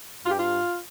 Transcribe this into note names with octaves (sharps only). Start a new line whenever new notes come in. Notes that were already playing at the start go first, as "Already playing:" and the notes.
G2 F4
G4
F4